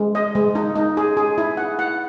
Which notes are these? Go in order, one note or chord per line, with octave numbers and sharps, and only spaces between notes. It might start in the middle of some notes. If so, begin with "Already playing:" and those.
Already playing: G#3
D#5
G#3
D#4
D#4
G#4
G#4
E4
F#5
F#5